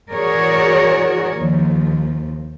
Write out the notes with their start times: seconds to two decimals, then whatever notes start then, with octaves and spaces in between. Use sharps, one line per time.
0.13 E3 F#4 G#4 A#4 C#5 D5
1.33 D#2 F3